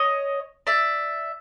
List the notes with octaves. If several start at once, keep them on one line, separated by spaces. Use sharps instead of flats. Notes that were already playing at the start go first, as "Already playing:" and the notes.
Already playing: C#5 D#5
D5 E5